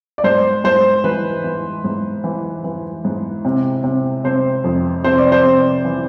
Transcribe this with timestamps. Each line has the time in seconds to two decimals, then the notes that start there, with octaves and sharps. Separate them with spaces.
0.18 D5
0.24 G#2 C5
0.64 G#2 C5
1.04 E3 B4
1.44 E3
1.84 G#2
2.24 E3
2.64 E3
3.05 G#2
3.45 C3
3.84 C3
4.24 C3 C5
4.64 F2
5.04 C3 C5
5.18 D5
5.32 C5
5.44 C3
5.85 E3